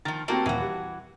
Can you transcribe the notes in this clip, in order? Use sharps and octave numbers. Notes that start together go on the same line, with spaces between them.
D#3 F3 A6
A3 A#3 C4 F#4 G4
D#1 E3 F#4
G3